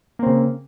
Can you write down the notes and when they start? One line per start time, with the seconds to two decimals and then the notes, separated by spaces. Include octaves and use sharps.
0.19 A#3
0.23 C4
0.26 C#3